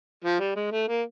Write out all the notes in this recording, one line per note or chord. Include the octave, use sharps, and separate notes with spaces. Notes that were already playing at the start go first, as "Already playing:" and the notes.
F3
G3
G#3
A3
A#3